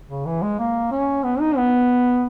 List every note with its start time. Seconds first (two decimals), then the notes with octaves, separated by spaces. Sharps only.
0.09 C#3
0.25 E3
0.42 G#3
0.59 A#3
0.91 C#4
1.24 B3
1.40 D#4
1.57 B3